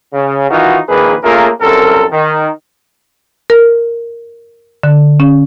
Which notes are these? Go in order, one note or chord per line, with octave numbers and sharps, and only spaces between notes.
C#3
D#3 E3 D#4 F4 F#4
A#1 D#3 A#3 G#4 B4
A3 A#3 C#4 F4 G#4 A#4
C2 F#2 C4 A4 A#4
D#3
A#4
D3
C#4